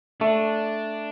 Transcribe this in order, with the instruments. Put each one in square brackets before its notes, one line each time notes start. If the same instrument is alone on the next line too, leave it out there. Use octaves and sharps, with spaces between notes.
[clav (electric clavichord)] A3 [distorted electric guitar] D4